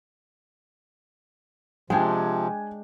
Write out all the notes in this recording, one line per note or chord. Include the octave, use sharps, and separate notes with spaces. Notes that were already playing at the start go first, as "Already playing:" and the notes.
C3 F3 G#3 D4 G5 G#5